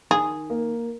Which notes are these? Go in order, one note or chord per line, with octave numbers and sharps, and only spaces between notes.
D#3 G#4
A#3